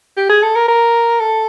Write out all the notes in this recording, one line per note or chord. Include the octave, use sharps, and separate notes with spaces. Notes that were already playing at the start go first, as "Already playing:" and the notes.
G4
G#4
A4
A#4
A#4
A4